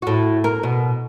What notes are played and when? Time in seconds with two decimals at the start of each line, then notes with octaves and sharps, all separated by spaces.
0.02 A2 F#4
0.44 A#4
0.63 B2